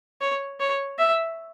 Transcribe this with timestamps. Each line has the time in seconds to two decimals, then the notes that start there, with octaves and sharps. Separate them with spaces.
0.21 C#5
0.60 C#5
0.99 E5